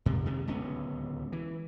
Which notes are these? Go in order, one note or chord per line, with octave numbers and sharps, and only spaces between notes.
F2 C3
C3 D#3 G#3
D1 C#2 B3 C#4
E3